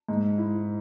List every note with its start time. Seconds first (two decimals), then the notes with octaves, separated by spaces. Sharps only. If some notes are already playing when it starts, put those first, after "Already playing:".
0.09 G#2
0.38 E4